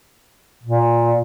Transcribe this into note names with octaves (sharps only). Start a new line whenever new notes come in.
A#2